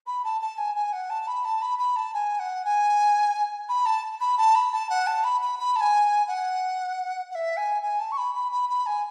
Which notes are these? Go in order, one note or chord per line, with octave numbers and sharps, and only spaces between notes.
B5
A5
A5
G#5
G#5
F#5
A5
B5
A5
B5
B5
A5
G#5
F#5
G#5
B5
A5
B5
A5
B5
A5
F#5
A5
B5
B5
B5
A5
G#5
F#5
F#5
E5
G#5
G#5
A5
C#6
B5
B5
B5
B5
G#5